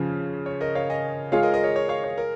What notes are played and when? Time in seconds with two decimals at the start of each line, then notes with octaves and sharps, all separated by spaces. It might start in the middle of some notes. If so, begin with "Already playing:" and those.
Already playing: C#3 F3 C#4
0.46 C#5
0.61 A#4 D#5
0.75 C#5 F5
0.90 D#5 G#5
1.32 G#3 F4 G#4 C#5 F5
1.43 A#4 D#5
1.54 A#4 D#5
1.64 C#5
1.76 C#5
1.89 C#5 F5
2.04 C#5
2.18 A#4